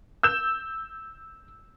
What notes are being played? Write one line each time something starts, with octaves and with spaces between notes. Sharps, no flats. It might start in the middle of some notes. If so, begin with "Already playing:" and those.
E6 G6 E7